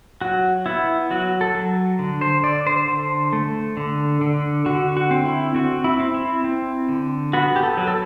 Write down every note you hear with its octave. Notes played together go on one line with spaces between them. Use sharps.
F#3 F#4
B3 E4
F#3 F#4
A4
F#3
D3
C5
D3 D5
C5
D3
A3
D3
D3
D3 F#4
F#4
C4
E4
C4 F#4
E4
C4
E4
C4
D3
B3 F#4
G4
A4
F#3
A4